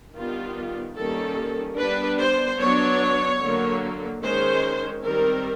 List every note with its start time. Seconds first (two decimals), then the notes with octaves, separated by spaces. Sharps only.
0.16 D#3 G3 B3 D4 F4
0.97 D#3 G3 A#3 C#4 A4
1.78 G3 B3 D4 B4
2.20 C5
2.60 F#3 B3 D4 C#5
3.41 D3 F#3 A#3
4.22 D#3 G#3 C#4 C5
5.03 D#3 G3 C4 A#4